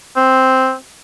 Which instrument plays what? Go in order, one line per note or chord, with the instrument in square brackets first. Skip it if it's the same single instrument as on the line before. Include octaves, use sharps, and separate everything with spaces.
[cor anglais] C4